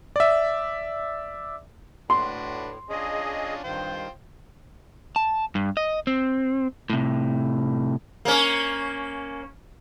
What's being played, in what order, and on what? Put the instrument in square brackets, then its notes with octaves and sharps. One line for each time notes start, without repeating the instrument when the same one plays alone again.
[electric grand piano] D5 E5
[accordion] A2 [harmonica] D4 F#4 B4 [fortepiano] C6
[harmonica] C#4 D4 F4 [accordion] G#4 D#5
[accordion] G2 D#3 [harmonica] F4 C5 G5
[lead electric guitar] A5
G2
D#5
C4
A2 C3
[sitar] A#3 C#4